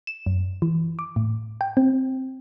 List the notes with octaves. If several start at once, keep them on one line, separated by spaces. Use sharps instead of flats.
E7
F#2
E3
D6
A2
G5
C4